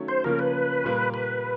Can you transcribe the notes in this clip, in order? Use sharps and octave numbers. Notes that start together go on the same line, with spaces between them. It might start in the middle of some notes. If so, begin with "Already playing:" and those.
Already playing: D#3 F#3 A3 C#4
C5
C#3 F3 A#3 C#4 A#4
B4
A#2 G3 A#3
B4